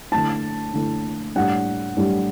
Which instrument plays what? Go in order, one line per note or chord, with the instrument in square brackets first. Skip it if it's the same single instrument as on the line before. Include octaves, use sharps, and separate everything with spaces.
[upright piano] D3 A3 E4 A5
D3 A3 E4
A2 G3 D4 F#5
A2 G3 D4